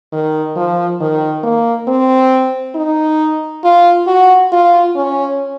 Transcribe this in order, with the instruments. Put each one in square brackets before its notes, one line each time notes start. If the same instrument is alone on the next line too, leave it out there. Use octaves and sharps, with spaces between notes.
[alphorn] D#3
F3
D#3
A#3
C4
D#4
F4
F#4
F4
C#4